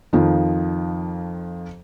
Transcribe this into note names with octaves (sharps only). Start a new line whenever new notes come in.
F2 D#3 F3